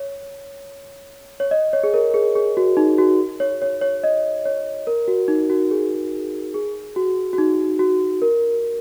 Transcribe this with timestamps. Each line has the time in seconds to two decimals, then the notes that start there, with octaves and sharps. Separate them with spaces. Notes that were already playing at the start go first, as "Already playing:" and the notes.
Already playing: C#5
1.40 C#5
1.51 D#5
1.73 C#5
1.83 G#4
1.94 A#4
2.14 G#4
2.35 G#4
2.57 F#4
2.77 D#4
2.98 F#4
3.40 C#5
3.62 C#5
3.81 C#5
4.04 D#5
4.45 C#5
4.87 A#4
5.08 F#4
5.28 D#4
5.50 F#4
5.71 G#4
6.54 G#4
6.96 F#4
7.33 F#4
7.38 D#4
7.79 F#4
8.22 A#4